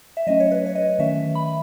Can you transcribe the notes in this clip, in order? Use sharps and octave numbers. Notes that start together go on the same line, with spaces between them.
E5
F#3 A3 C#4 D#5
C#5
B4
C#5
D#5
D#3 A3 C#4 E5
B5